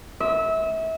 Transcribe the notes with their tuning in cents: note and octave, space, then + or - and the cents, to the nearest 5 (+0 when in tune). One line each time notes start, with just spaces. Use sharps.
E5 -30